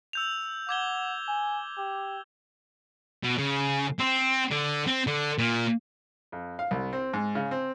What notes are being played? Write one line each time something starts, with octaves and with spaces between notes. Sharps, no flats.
E6 G6 F7
F#5 D6 G#6 G7
G#5
G4
B2
C#3
C4
D3
C4
D3
A#2
F2
F5
C2
C4
G#2
C#3
C4